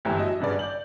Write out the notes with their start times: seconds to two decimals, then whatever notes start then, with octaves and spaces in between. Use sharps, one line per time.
0.05 G1 A2 E3 E4 G4 A#5
0.18 F#3 D#5 E5
0.39 G#1 G2 C#3 B4 D5
0.59 D5 G6 F#7